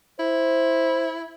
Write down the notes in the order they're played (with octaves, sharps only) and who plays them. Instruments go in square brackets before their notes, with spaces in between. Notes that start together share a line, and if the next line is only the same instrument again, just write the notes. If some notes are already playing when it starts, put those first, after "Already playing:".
[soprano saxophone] E4 [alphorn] C5